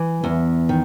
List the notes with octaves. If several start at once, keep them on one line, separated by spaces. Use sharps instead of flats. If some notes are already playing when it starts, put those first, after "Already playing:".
Already playing: E3
E2
D#3